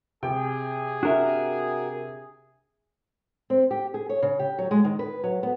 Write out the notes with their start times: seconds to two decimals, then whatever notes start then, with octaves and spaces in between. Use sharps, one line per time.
0.23 C3 G#4 G5
1.03 D4 F#4 A#4 E5
3.50 C4
3.71 G4
3.94 G#4
4.09 C#5
4.22 C#3
4.39 G4
4.58 F#3
4.71 G#3
4.85 D#3
4.99 B4
5.24 F#3
5.43 B3